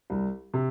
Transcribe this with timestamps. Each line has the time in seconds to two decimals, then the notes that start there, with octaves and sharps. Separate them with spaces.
0.10 C2
0.54 C3